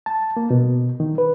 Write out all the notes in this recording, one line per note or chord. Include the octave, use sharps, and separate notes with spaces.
A5
A#3
B2
D#3
B4